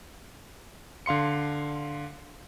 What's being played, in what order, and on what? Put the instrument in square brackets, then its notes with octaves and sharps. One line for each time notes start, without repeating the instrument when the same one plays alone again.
[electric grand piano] D3 F5 C6 C#7